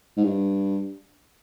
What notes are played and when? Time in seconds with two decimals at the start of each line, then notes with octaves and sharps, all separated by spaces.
0.17 G#2
0.24 G2